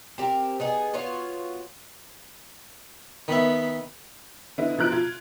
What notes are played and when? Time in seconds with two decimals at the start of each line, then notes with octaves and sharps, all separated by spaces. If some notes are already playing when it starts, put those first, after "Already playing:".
0.18 C4 G4 A4 A#4
0.60 B3 D#4 G#4
0.94 B3 F4 F#4 C#5
3.28 D#3 B3 E5 B5
4.58 D3 B3 D#4 E4
4.78 B2 F3 A#5 F#6 D7
4.92 F4 G#6